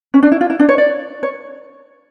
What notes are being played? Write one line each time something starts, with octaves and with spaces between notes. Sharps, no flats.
C#4
D4
E4
F4
E4
D4
C#5
D5
C#5